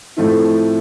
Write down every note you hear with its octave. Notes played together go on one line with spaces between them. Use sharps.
A2 F3 A3 C4 E4